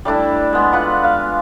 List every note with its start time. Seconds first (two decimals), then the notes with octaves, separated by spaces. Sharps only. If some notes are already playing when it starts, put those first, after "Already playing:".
0.05 G3 A3 D4 E4
0.53 G#3 B3 C6
0.73 F4 B4 F#5
1.04 F5